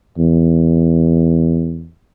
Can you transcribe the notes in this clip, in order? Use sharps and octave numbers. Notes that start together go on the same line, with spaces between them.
E2